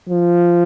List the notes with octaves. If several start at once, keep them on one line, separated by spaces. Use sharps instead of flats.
F3